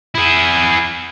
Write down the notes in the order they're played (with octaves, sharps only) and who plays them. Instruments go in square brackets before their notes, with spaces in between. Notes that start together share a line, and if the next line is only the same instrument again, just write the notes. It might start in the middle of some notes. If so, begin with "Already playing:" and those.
[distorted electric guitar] E4 G#4